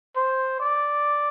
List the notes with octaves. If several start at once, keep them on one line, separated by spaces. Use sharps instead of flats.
C5
D5